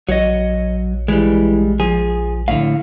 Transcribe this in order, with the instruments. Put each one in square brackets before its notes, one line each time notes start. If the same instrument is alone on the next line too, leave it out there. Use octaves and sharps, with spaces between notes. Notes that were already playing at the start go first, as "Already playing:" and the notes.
[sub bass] A#1 [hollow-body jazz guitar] F#3 [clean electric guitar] C#5 D#5
[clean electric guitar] E3 [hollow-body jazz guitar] G3 G#3
[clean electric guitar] F3 [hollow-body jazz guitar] G#4
[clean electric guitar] A2 D3 [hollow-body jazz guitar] F5